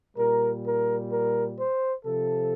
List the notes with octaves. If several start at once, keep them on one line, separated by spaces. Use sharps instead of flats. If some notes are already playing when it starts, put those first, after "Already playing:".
A#2 G3 A#4
A#4
A#4
C5
C3 F3 A4